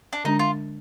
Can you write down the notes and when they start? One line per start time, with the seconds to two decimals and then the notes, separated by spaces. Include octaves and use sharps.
0.13 D4
0.25 D3 G#3 D4 D#4
0.39 F4